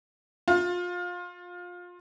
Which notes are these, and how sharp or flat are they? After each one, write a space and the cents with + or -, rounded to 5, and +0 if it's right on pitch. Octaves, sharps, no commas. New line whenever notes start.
F4 +25